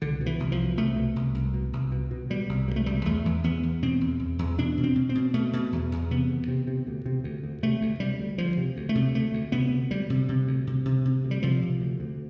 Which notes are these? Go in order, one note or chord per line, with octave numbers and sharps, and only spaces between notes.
C2 D3
B2
E3
C2
F3
B2
C2 A3
B2
C2
C2
B2
C2
B2
B2
B2 G3
C2
B2 G3
A3
C2 G3
E2 A3
E2
E2 B3
E2
B2 C4
E2
E2
E2
B2 D4
B2
C4
B2
C4
B2
B2 A3
B2
E2
E2
C3 B3
D2
C3
C3
D2
C3
D2
D2
C3 A3
D2
C3 G3
D2
D2 F3
C3
D2
A3
C3
D2 A3
D2
C3 B3
D2
D2 G3
C3
C3
D2
C3
C3
C3
D2
G3
C3 F3
C3
D2
D2